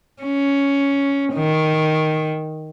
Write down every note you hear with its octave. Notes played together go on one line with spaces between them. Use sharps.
C#4
D#3